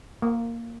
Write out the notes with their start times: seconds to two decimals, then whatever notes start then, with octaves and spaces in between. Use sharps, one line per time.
0.22 A#3